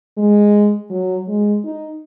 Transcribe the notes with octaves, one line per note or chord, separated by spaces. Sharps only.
G#3
F#3
G#3
D#4